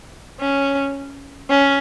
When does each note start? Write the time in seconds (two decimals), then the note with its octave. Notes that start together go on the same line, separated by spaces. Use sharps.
0.41 C#4
1.50 C#4